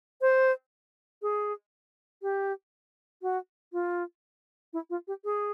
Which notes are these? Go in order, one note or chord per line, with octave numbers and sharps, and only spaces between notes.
C5
G#4
G4
F#4
F4
E4
F4
G4
G#4